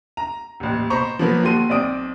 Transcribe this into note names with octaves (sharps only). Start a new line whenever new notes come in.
A#5
D#1 A1
B2 C5 A#5 B5 C#6
F3 F#3 A#3 B3 A#4 B4
D#2 F#4 A4 C6 D#7
B1 C4 D5 D#6 D7